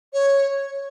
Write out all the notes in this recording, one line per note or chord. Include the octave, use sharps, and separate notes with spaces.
C#5